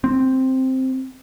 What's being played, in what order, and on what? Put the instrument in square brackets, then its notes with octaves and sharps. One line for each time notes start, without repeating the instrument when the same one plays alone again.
[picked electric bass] C4